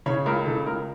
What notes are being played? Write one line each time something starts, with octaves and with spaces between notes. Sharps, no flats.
C#3 C#5
C#2 A#4
C#3 A4
C#2 A#4